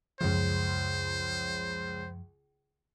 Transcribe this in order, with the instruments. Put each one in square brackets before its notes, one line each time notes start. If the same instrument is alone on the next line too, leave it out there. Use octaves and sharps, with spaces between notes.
[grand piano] C#2 C#3 [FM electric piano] F#2 F3 [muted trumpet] C5